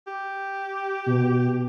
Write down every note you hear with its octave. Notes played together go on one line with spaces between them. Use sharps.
G4
B2